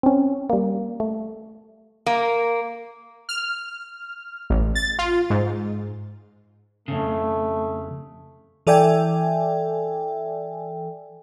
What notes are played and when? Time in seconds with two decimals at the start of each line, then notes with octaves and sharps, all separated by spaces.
0.03 C4 C#4
0.50 G3 A#3
1.00 A3
2.06 A#3
3.29 F6
4.50 A1
4.75 A6
4.99 F4
5.30 G#2
6.88 F2 A#2 C#3 A3
8.67 E3 A4 D5 E5 G5 G#5